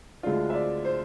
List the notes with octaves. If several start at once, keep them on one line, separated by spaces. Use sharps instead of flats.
D2 D3 G#3 D4 F4
E5
D5
C5